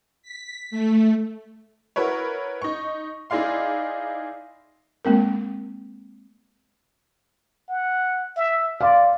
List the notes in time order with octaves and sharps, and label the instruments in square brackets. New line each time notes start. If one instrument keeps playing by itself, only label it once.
[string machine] B6
A3
[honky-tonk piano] E4 F#4 A#4 B4 C#5
D#4 C#6
D#4 E4 G#4 D5 F5 C6
[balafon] G#3 A#3 C4 A#4
[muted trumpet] F#5
E5
[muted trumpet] D5 [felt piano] F5 C6